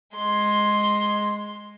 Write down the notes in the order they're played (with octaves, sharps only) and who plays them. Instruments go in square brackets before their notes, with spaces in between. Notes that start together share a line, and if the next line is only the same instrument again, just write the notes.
[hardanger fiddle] G#3 C6